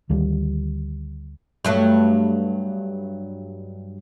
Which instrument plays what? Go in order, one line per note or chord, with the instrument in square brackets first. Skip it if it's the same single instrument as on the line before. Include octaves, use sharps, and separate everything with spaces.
[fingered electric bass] D2 D#3 G3
[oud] G2 F#3 A3